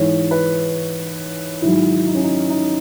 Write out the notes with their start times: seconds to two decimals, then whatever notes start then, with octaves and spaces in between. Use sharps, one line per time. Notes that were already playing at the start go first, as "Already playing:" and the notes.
Already playing: G#2 E3 C#5
0.31 B4
1.62 G#2 D#3 F#3 E4
2.07 D#4
2.15 C#4
2.23 D#4
2.50 D#4